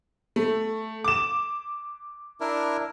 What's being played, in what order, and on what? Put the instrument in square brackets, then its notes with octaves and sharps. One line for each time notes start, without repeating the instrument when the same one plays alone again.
[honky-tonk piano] A3
D6 E7
[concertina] D4 E4 A#4